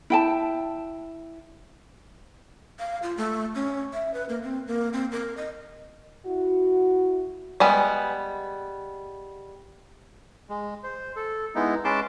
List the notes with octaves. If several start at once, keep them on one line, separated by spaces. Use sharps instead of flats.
E4 G5 A5
F5
F4
A3
C#4
E5
B4
A#3
C4
A#3
C4
A#4
D#5
E4 F#4
G3 G#3 B3
G#3
C5
A4
G#3 B3 D#4 E4
G#3 C#4 B4 A5 C6 D6